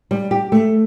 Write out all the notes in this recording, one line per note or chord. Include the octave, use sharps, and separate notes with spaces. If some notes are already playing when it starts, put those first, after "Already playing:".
G3
G4
A3